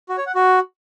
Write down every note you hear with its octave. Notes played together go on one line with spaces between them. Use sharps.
F#4
C#5
F#5
F#4